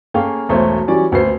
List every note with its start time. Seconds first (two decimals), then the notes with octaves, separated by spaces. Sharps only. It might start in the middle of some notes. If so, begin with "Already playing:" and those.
0.14 A#3 C#4 G#4 A4 F5 G5
0.49 E1 B1 A3 C5 C#5
0.87 E3 F#3 G3 C#4 D5
1.11 D#1 D2 B2 B3 C5 C7